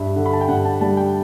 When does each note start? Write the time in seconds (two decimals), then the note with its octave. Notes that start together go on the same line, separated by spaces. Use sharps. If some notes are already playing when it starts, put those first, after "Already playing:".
Already playing: G2 E5
0.16 D3
0.26 B5
0.33 A5
0.41 G5
0.48 G2 F#5
0.65 A5
0.81 G3 A5
0.97 G5